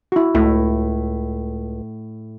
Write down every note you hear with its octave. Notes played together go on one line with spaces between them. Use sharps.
E4 F#4
C#2 A2 E4